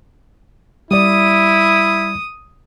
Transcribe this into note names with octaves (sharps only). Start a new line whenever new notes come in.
G3 E4 D5 D#6